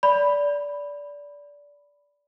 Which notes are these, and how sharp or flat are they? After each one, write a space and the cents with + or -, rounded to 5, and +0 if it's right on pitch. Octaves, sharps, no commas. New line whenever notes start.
D5 -20 B5 +0